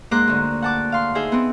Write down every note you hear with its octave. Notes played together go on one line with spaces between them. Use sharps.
G#2 A#3 C5 A#5 D6 F#6
D2 D3
F#5 A5 D6
F5 C6
D#4 G#4 C5 E5
B3 C4